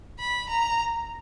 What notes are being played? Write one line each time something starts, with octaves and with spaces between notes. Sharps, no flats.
B5
A#5